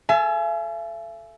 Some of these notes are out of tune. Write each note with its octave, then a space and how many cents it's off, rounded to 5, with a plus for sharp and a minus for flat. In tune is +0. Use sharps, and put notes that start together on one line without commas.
A4 +0 E5 +45 G#5 +30